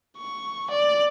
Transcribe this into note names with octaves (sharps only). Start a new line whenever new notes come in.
C#6
D5